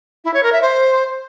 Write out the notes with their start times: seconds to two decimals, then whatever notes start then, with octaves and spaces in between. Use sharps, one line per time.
0.24 E4
0.34 C#5
0.43 A#4
0.52 E5
0.62 C5